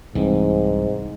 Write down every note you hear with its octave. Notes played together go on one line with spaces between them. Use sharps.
C2 G#2 E3 C4